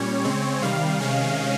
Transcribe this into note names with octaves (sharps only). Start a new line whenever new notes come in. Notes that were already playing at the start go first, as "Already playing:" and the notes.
Already playing: A#2 G3 C#4 C#5
C#3 G#3 C4
C3 D#3 G3 F5
C3 D#3 G#3 C#4